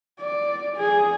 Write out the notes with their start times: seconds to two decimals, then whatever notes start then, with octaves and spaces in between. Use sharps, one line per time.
0.20 D5
0.77 G#4